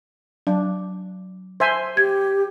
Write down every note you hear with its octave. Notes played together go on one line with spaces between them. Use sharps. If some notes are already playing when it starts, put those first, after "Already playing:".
F#3 D4
C5 E5 G#5
G4 G#6